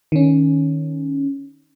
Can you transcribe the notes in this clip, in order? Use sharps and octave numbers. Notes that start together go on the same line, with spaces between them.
D#3 C#4